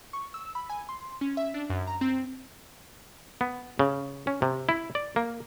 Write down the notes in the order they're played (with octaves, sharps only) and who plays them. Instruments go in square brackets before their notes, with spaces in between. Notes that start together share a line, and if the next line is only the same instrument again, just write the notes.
[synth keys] C#6
E6
B5
G#5
C6
C#4
E5
D4
F#2
A#5
C4
[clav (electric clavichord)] B3
C#3
C#4
C3
E4
D5
A#3